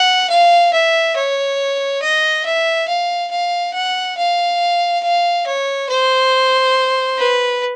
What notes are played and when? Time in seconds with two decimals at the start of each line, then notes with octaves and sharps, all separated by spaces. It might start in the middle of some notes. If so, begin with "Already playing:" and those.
Already playing: F#5
0.29 F5
0.73 E5
1.16 C#5
2.02 D#5
2.45 E5
2.88 F5
3.31 F5
3.73 F#5
4.17 F5
5.03 F5
5.46 C#5
5.89 C5
7.18 B4